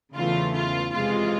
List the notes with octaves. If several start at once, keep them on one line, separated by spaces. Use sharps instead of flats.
E2 C#3 E3 A3 F4
F4
F2 C3 E3 G#3 F4